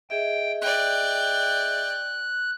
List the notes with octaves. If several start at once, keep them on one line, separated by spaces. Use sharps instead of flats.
G#4 D#5 E5 G5
D5 G5 F#6